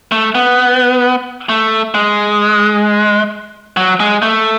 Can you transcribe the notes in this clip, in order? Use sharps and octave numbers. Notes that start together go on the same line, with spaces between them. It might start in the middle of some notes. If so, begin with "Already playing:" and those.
A3
B3
A3
G#3
F#3
G#3
A3